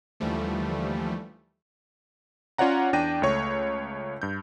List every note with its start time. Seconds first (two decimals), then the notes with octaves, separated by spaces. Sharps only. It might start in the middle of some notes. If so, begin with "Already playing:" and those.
0.20 D#2 D3 E3 F3 G3 A3
2.58 C#4 F4 C#5 D5 F#5 A#5
2.93 E2 D4 D5 G5 A#6 D#7
3.22 C#2 A3 C#5 C#6
4.22 G2 G6